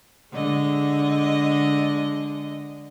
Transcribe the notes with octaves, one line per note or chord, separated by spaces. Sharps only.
D3 G#3 D#5